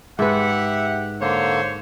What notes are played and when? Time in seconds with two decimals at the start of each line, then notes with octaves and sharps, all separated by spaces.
0.19 G#2 G4 B4 E5 F#5
1.21 D3 A#3 C5 C#5